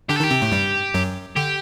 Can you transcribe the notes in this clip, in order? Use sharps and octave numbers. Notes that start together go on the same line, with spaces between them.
D3 D4 G4
A4
D#3 D#4 G4
C3 C4
A2 A3
G2 G3
F#2 F#3
D3 G4